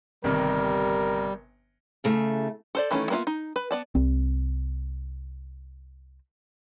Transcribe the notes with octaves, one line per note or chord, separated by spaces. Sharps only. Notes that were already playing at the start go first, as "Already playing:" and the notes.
G1 C3 D#3 G3 A#4
E2 C#3 A3
A4 C5 D5
D#3 E3 A3 C#4 A4
A#3 B3 D4 F4 E5
D#4
B4
B3 D5 A5
C2 C4